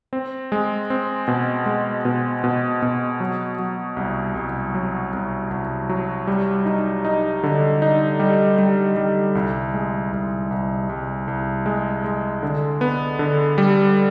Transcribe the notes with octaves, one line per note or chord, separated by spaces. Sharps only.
C4
G#3
C4
B2
G#3
B2
B2
B2
F#3
F#3
C2
C2
F#3
C2
C2
F#3
G3
D#4
D#4
D3
D#4
G3
G3
G3
C2
G#3
C2
C2
C2
C2
G#3
G#3
D3
B3
D3
G3